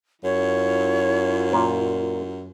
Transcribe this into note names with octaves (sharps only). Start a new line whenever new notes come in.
F#2 E4 F4 C#5
A#2 A#4